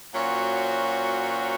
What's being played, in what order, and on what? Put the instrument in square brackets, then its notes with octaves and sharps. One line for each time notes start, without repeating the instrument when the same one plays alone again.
[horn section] A#2 F#3 C#4 F#4 C5